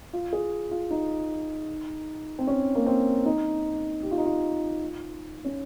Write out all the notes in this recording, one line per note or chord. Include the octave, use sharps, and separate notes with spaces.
F4
G#4
F4
D#4
C4
C#4
A#3
C4
D#4
G4
F4
D#4
F4
C#4